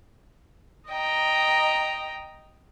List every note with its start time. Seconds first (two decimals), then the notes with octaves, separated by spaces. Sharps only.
0.89 D#5 G5 A#5